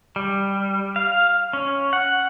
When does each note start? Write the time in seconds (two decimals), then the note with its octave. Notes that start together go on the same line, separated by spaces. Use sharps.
0.16 G3
0.96 F5
1.53 C#4
1.93 F#5